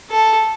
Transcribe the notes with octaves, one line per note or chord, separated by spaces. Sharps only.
A4